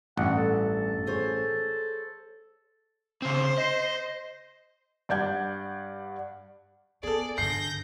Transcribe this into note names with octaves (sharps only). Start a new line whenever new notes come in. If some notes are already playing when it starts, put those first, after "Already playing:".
A1 G2 F#5
A4
G#4 C5 C#5
C#3 C4 C5
D#5
G2 D5 F#5 G6 G#6
B3 G#4 A4 D5
G2 D3 G6 A#6 C7